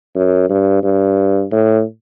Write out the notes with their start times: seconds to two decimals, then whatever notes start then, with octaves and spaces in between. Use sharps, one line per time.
0.16 F#2
0.49 G2
0.83 G2
1.52 A2